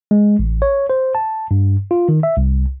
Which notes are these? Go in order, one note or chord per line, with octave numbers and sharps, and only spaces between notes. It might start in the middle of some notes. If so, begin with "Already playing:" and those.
G#3
A1
C#5
C5
A5
G2
F4
D#3
E5
C2